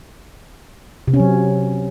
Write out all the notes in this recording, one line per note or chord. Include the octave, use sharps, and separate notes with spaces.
C3
C#4
F#3